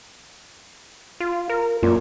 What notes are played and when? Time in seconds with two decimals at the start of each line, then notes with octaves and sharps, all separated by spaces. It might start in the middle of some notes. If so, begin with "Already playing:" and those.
1.20 F4
1.49 A#4
1.83 F#2 A#2